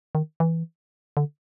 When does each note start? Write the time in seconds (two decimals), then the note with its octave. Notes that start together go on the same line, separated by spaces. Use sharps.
0.15 D#3
0.40 E3
1.17 D3